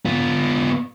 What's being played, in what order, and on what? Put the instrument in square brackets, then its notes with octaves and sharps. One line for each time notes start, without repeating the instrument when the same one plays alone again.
[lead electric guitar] B3 F4